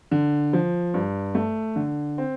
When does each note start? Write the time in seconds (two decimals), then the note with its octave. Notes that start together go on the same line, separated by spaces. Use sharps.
0.11 D3
0.53 F3
0.94 G2
1.35 A3
1.76 D3
2.18 C4